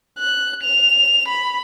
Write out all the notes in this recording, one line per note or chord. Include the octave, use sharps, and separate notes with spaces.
F#6
F7
B5